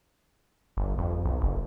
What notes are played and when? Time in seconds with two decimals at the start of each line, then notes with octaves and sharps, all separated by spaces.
0.77 G1
0.98 F2
1.25 B1
1.42 F#1